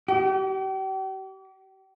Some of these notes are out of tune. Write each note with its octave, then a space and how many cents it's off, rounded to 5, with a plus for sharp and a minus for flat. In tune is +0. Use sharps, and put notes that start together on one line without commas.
G4 -40